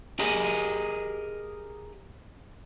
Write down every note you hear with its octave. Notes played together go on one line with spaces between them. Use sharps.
G4 G#4 A#4 D#5 G#5 B5